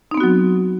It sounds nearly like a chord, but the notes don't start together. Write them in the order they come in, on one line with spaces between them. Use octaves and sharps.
D#4 C4 B3 F#4 F#3